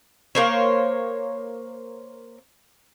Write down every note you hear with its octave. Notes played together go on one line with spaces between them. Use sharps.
A#3 C5 C#5